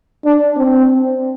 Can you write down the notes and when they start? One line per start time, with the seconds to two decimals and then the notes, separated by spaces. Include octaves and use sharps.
0.25 D4
0.56 C4